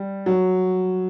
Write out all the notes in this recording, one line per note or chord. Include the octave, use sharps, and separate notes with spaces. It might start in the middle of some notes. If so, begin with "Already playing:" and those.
Already playing: G3
F#3